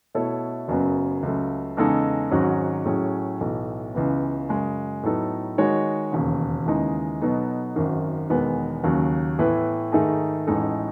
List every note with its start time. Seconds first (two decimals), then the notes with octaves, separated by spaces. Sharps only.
0.14 B2 A3 E4 A4 C#5
0.68 F#1 F#2 C#3 F#3 B3
1.23 C#2 C#3 F#3 A3
1.77 E2 C#3 G#3 D#4 A4
2.31 G#1 G#2 F#3 C#4 F#4
2.85 A2 F#3 C#4 G#4
3.41 B1 A2 E3 A3
3.95 C#2 C#3 E3 B3
4.49 F#2 C#3 G#3
5.03 A2 F#3 B3 D#4 A4
5.58 D#3 G#3 D#4 F#4 C#5
6.12 E1 D#2 C#3
6.66 D#2 C#3 E3 G#3 D#4
7.21 B2 F#3 B3 D#4 A4
7.76 G#1 F#2 D#3
8.30 E1 E2 D#3 G#3 B3
8.84 D#2 C#3 F#3
9.39 A2 E3 B3 E4 B4
9.92 G#2 D#3 A3 D#4 G#4
10.47 A1 A2 G#3 D#4 A4